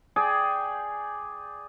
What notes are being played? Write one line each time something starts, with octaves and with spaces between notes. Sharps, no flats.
G#4 D5 G5